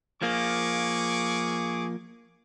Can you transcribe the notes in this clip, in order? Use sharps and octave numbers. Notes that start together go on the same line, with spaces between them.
F3 A#3 G#4 C#6 D6